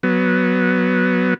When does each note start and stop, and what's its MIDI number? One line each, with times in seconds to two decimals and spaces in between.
0.03 1.34 54
0.03 1.34 59